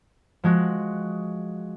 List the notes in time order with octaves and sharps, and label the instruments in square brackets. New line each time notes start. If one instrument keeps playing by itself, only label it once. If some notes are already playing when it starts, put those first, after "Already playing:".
[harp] F3 G#3 F#4